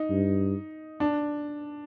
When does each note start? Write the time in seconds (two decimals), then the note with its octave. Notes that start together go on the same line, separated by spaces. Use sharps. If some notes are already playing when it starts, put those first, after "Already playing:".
Already playing: D#4
0.10 G2
1.00 D4